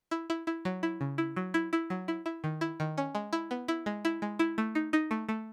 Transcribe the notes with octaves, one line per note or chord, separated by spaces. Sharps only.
E4
E4
E4
F#3
E4
C#3
E4
F#3
E4
E4
F#3
E4
E4
D#3
E4
D#3
C#4
G#3
E4
B3
E4
G#3
E4
G#3
E4
A3
D#4
D#4
A3
A3